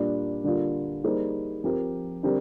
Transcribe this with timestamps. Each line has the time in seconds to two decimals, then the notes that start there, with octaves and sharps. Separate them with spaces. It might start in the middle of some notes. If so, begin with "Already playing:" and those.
Already playing: A#2 G3 D4
0.44 D3 G3 A#3 F4
1.04 G3 A#3 D#4 G#4 C5
1.64 F3 C4 G4 A#4
2.23 D3 G3 C4 G4 A#4